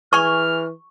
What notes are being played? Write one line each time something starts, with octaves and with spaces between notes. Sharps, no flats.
E3 G#4 G#5 C#6 F6